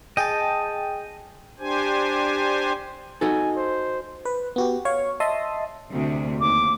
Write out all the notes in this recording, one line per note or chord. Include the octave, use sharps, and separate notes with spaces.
G#4 D#5 G5 A5
D4 G4 C5 G#5
D#4 F#4 A4 G#5
C5
B4
B3 F#4 G4
C#5 F5 C#6
D#5 E5 A5 C6 D#6
D2 C3
D#2 D6